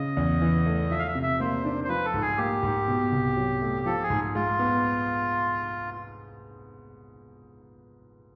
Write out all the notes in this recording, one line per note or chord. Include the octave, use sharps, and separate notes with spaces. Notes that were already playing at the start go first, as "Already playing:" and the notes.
Already playing: C#3 D#5
E2
E3
A3
F3 E5
F5
E5
C3
E5
A#3 C5
D4
C5
F3 B4
A4
G#2
G#4
A#3 G4
G#2
B2
C2
F#3
A3
F3 A4
G#4
G#2
G#3 F4
B3